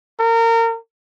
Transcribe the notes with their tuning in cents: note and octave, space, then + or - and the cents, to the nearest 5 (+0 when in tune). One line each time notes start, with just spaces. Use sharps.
A#4 -30